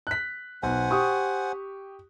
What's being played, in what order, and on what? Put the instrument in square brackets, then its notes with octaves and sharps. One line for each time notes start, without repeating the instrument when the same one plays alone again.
[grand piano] F#6 B6
[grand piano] B1 [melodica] C5 F#5 G#5
[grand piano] G4 C#6 D#6